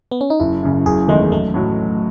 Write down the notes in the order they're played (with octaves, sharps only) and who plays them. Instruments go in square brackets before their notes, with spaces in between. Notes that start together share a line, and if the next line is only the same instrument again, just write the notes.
[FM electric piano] B3
C#4
D#4
[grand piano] F#1 [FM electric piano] E4
[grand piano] F#2 C#3
[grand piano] F#1 [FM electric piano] G#4
[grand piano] E2 D#3 G#3 D#4 [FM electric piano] A3
[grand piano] B1 [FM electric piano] A3
[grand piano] A2 F#3